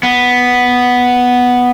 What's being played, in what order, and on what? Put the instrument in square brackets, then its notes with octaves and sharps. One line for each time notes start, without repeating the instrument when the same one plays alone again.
[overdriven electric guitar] B3